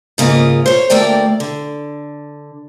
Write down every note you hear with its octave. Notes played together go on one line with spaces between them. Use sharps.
G#2 C#3 A#3 F4 D#5
C5 C#5
D2 A3 A#3 A#4 D5 G5
D3